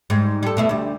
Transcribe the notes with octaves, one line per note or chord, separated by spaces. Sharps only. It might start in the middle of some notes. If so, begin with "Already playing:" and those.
G#2 G3
G3 A4
B2 A3 E4
D2 G3